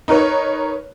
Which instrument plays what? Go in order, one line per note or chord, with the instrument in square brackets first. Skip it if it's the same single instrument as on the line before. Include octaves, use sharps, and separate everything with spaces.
[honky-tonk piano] D#4 A#4 B4 C#5